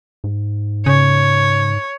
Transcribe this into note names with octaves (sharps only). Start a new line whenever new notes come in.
G#2
C#3 C#5